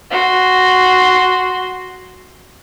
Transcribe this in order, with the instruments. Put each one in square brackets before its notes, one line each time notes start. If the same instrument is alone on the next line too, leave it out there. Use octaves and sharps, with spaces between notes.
[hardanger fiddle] F#4 C6